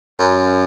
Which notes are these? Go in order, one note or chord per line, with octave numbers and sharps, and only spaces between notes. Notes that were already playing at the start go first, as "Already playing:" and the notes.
F#2